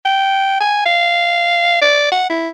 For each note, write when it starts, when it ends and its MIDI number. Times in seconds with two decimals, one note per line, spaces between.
0.05 0.58 79
0.60 0.83 80
0.86 1.79 77
1.82 2.11 74
2.12 2.28 78
2.29 2.48 64